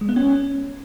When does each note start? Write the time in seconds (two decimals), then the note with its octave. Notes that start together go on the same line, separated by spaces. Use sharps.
0.01 G#3
0.09 B3
0.16 C#4